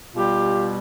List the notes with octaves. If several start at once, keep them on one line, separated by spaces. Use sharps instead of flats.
B2 G3 F4 G4